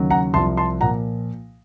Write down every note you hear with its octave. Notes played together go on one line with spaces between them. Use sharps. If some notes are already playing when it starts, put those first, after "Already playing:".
Already playing: D#2 C#3 F#3
F#5 A#5
C2 C3 F3 A5 C6
A5 C6
A#2 F3 F#5 A#5